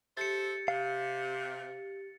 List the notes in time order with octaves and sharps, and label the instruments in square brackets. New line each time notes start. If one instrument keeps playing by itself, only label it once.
[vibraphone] G4 [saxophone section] A4 C5 E5 [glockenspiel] A6 C#7
[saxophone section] C3 [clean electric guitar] F5